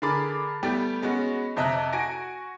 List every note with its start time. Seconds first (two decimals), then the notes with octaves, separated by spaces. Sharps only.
0.02 D3 G#4 A#4 B5 D6 A6
0.63 G3 A3 B3 G4
1.02 G#3 B3 C#4 F#4
1.56 F2 C3 D#5 E5 A#5 F#6
1.93 F#4 G#5 A#6 D7